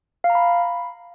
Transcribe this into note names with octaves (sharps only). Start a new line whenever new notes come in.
F5
A#5
B5